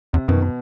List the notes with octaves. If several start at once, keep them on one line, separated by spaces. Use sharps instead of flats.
E2 C3
F#2 B2 D#3
B2